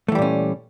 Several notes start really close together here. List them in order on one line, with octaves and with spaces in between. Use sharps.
A3 E3 G3 A#2 C#4